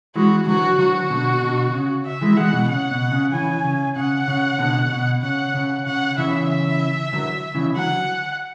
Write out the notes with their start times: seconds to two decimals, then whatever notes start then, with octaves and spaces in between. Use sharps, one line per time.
0.16 E3 G#3 F#4
0.47 D3 F#3 F#4
0.78 D3 F#3 F#4
1.10 B2 D3
1.42 B2 D3
1.74 C#3
2.06 E5
2.21 E3 G#3
2.37 E3 G#3 F#5
2.53 B2
2.68 C#3 F#5
2.91 B2
3.12 C#3
3.32 C#3 E3 G#5
3.64 C#3
3.96 C#3 F#5
4.28 C#3
4.59 B2 D3
4.92 B2
5.22 C#3 F#5
5.54 C#3
5.86 C#3 F#5
6.18 C#3 E3 E5
6.49 E5
7.13 D3 F#3
7.55 C#3 E3
7.76 D3 F#3 F#5